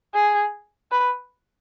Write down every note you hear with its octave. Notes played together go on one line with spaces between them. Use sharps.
G#4
B4